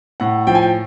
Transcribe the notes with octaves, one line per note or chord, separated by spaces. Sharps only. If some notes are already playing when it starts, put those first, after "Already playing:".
A2 F#5
F3 G5
G#5
G5